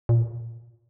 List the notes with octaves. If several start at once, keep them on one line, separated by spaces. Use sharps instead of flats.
A#2